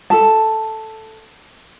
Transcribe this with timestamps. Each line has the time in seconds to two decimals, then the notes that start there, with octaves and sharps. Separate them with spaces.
0.10 A4 A5